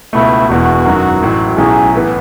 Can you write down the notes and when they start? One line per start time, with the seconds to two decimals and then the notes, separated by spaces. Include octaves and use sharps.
0.13 C#2 B2 A3 E4
0.49 E1 E2 B2 F#4
0.85 F#2 D#3 F#3
1.21 A1 A2 F#3
1.57 B1 A2 F#3 C#4 G#4
1.94 A2 E3 B3